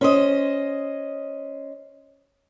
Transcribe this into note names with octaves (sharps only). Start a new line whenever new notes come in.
C#4 C5 D#5